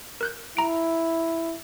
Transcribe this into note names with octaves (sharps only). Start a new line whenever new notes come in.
A#4 F#6 G6
E4 A#5 D7